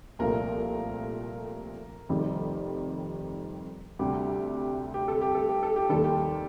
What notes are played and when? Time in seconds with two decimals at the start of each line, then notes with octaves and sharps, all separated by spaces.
0.19 C2 A#2 F3 A3 A#4
2.09 F1 F2 D#3 G3
3.99 D2 C3 G3 G4
4.94 G4
5.08 A4
5.22 G4
5.35 A4
5.49 G4
5.63 A4
5.76 G4
5.89 F1 D#2 D#3 G3 A4
6.04 G4